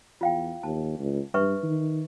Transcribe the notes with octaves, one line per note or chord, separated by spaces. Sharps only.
E2 F4 F5 G5
D#2 A5
C#2
G2 B4 E5 C#6
D#3